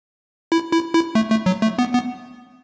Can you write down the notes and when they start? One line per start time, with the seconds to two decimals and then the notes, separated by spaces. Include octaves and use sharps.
0.52 E4
0.72 E4
0.94 E4
1.15 A3
1.30 A3
1.46 F#3
1.62 A3
1.79 B3
1.93 B3